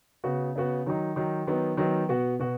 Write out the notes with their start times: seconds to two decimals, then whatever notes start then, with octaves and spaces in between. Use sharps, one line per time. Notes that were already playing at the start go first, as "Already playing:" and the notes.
0.24 C#3 B3 F#4
0.56 C#3 B3 F#4
0.86 D#3 F#3 D#4
1.16 D#3 F#3 D#4
1.47 D#3 F#3 B3 D#4
1.77 D#3 F#3 B3 D#4
2.09 B2 B3 F#4
2.39 B2 B3 F#4